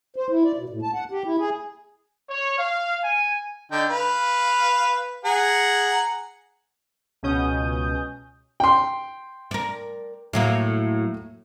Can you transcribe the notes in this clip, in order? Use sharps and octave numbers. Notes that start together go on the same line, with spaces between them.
C5
E4
D5
B2
A2
A5
F#5
G4
E4
G#4
C#5
F5
G#5
D3 D#4 G5
B4 F5
G#4 F#5 A#5
C#2 B2 C#4 D#6 G6
G5 C6
A#4 D5
A2 F#3 A#3